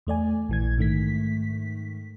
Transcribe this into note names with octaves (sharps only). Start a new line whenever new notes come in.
E2 A3 D5 G#5
A#1 E3 G#6
G#2 D#3 A3 B6